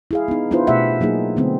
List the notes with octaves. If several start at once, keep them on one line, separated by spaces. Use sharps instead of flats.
E4 G#4 F5
B3 D#4
B3 D4 E4 F4 B4 C5
B2 A3 B3 G4 E5 F#5
F#3 A#3 D#4 G#4
D3 A3 B3 C4